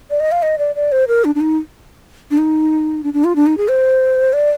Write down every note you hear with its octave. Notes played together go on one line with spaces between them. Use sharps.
D5
D#5
F5
D#5
D5
D5
C5
A#4
D4
D4
D#4
D4
D#4
D4
D4
F4
D4
D#4
G#4
C5
D5